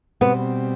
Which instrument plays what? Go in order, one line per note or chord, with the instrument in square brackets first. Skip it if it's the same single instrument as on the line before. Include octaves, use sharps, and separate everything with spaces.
[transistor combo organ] B2 G3 C4 [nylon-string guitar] B3